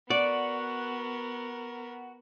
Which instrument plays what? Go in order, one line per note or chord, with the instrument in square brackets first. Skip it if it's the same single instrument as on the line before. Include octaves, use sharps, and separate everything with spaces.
[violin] B3 A#4 [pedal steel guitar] F#4 [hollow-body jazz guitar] D5